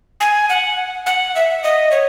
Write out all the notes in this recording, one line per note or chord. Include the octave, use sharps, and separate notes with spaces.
G#5
F#5
F#5
E5
D#5
C#5